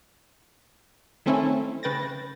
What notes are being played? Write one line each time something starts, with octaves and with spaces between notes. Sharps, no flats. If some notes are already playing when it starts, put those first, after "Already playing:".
D#3 A3 C4 C#4 E4 A4
C#3 B4 G5 A6 A#6